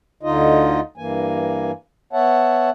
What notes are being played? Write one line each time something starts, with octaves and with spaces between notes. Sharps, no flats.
D2 D3 D#4 F4 D#5
G2 E3 A#3 G#5
B3 C#5 E5 F#5 A5